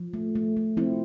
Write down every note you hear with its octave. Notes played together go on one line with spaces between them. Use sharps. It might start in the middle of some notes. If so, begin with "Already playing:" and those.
Already playing: F3
A3
A3
A3
F3 C4 E4